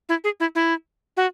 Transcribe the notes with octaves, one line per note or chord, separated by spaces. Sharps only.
E4
G#4
E4
E4
F#4